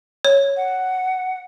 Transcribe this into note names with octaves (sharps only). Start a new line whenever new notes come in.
C#5
F#5